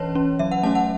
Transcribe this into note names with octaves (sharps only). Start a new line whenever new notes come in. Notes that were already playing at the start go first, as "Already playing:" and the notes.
Already playing: E3 C#4 B4 C#5 A5
C#4
F#3 E5
F#5
A3 C#4 A5
F#5